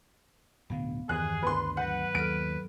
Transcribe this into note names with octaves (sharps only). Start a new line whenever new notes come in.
D1 B2 D3 B3 F5
E2 G2 D#3 G#4 F#6
D2 B4 C6
F#3 B4 F#5 G6
D#2 F#3 A4 F6 D7